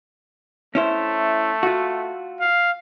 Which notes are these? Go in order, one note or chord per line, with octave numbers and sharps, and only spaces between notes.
A3 C#4 E4 C5
F4 F#4
F5